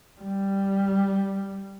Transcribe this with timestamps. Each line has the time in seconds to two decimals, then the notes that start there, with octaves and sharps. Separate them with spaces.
0.21 G3